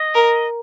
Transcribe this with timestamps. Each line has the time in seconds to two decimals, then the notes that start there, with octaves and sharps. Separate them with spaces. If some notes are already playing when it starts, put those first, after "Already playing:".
Already playing: D#5
0.15 A#4